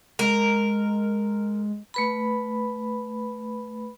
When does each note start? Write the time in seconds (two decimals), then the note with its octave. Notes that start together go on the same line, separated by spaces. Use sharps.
0.19 G#3 A#4
1.94 A3 B4 B5